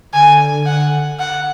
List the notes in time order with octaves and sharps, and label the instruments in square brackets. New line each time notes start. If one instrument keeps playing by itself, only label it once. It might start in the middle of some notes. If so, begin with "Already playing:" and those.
[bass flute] D3 [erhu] G#5
[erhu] F#5
F#5